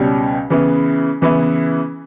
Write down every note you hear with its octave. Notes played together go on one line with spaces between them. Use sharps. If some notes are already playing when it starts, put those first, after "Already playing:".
Already playing: C#2 B2 G3 C#4 G4
C#3 E3 B3 E4
C#3 E3 B3 E4